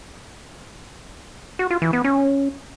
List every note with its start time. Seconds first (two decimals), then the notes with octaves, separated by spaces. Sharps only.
1.59 F#4
1.71 F4
1.82 E3
1.93 B3
2.04 C#4